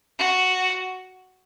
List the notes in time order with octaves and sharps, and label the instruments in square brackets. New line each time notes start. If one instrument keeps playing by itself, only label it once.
[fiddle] F#4